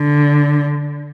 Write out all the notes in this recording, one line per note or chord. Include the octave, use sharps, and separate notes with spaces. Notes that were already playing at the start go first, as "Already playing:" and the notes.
Already playing: D3